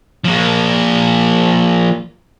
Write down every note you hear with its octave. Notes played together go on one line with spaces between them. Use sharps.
F3 A#3